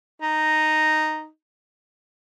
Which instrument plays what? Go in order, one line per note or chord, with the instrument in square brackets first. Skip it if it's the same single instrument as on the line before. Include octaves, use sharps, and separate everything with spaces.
[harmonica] D#4